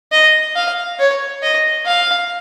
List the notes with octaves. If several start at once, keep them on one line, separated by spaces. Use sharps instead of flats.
D#5
F5
C#5
D#5
F5